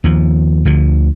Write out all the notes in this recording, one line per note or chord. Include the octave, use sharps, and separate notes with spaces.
D#2 F3
D2 D3 F3